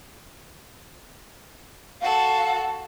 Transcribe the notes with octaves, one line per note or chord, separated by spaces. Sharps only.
F#4 A4 F5